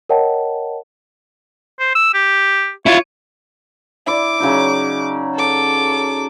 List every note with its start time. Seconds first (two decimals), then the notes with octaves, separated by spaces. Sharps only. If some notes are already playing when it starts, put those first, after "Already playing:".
0.09 A#4 C#5 D#5 F#5 G5 A5
1.80 C5
1.95 E6
2.14 G4
2.86 E4 F4 C#5
4.07 E4 D5 D6
4.40 C#3 F#3 D#4
5.35 A4 D6